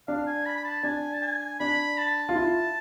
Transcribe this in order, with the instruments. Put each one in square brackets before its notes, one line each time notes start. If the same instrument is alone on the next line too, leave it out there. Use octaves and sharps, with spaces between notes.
[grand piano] D4 [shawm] F5
[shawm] G#5
B5
B5
A5
[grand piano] D4 [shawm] G#5
[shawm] A5
G#5
[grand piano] D4 [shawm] B5
[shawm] A5
[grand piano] F4
E4